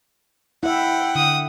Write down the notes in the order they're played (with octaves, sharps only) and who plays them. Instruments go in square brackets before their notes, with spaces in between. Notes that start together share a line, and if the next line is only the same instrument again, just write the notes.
[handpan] E4 E5 [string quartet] F#5 G5
[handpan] D3 [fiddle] D#6